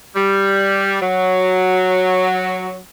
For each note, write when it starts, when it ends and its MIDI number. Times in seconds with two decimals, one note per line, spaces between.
0.15 1.00 55
1.02 2.77 54